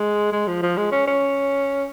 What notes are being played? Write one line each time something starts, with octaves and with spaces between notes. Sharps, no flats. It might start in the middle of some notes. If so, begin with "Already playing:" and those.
Already playing: G#3
G#3
F3
F3
G#3
C#4
C#4